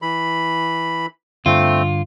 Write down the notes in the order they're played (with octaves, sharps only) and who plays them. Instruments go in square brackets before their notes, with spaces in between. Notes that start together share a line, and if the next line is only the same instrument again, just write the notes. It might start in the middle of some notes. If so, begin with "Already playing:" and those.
[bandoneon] E3 B5
[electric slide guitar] G2 D3 [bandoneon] A3 C4 [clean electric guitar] F4